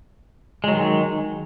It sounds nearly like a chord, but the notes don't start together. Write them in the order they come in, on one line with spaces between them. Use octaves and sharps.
G#3 F#3 D#3